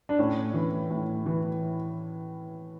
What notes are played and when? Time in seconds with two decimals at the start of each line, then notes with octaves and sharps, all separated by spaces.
0.09 D4
0.19 A2 C#4
0.54 E3
0.90 A2
1.26 E3